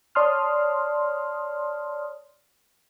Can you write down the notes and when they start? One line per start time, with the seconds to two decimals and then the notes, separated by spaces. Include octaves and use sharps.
0.15 C#5 D5 A5 C6 D#6 F6